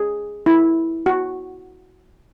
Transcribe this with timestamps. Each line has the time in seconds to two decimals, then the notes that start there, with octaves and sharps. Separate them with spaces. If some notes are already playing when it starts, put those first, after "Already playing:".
Already playing: G#4
0.46 E4
1.06 F#4